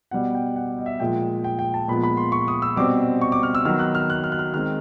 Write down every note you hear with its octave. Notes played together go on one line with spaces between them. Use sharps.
B2 G3 B3 F#5
G5
F#5
D#5
E5
A#2 F3 G#3 G5
G5
G5
A5
A#2 F3 G#3 B3 B5
B5
C6
C#6
D#6
E6
B2 G3 C4 D6
C#6
D6
F6
E6
D#3 F#3 B3 F6
F#6
F6
F#6
F6
F#6
F6
D#3 G#3 C4 F6